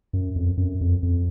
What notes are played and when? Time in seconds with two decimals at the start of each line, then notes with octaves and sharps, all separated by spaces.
0.13 F#2
0.36 F2
0.57 F#2
0.81 F2
1.03 F2